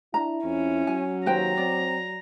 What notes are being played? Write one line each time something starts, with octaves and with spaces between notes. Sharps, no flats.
D4 E4 A#5
F2 C#4
F#3 G#5
D#2 B4 C5 G5 A#5
C4 D5